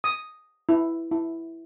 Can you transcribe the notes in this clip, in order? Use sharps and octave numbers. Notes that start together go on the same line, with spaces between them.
D#6
E4
E4